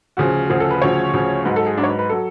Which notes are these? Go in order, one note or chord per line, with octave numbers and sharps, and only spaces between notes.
D2 C#3 F3 F#4
D2 C#3 F3 G#4
A4
B4
D2 C#3 F3 C#5
D2 C#3 F3
G#2 F#3 B4
A4
G#4
G#2 F#3 D4
C#5
B4
B4
F#3 A4